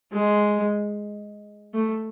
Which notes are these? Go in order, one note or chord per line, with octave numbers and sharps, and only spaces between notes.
G#3
A3